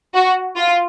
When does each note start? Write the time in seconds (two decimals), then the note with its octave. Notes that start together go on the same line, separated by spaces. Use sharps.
0.15 F#4
0.57 F4